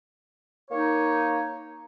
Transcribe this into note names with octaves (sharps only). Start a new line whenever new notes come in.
A#3 D#4 C#5